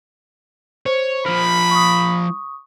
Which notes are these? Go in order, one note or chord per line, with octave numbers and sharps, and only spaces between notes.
C5 C#5
F3 A#4 B5
C#6 D#6